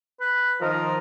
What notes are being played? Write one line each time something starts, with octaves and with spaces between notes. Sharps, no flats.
B4
D#3 F3 D#4 A#4